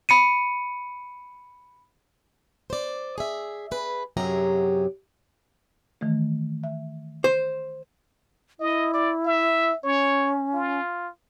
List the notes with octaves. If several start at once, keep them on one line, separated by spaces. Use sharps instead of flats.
B5 C#7 D#7
C5 D5
G#4 E5
G#4 B4
F#2 C3 F#3 G4 G#4 A#5
D#3 E3 A3
E5
C5
E4 D#5
D5
E5
C#4 C#5
F4